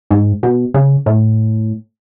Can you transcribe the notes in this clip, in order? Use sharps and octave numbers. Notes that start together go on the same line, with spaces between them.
G#2
B2
C#3
A2